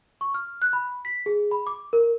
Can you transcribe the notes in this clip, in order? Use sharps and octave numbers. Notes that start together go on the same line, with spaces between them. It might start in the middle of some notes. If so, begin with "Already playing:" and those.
C#6
F6
F#6
B5
B6
G#4
B5
D6
A#4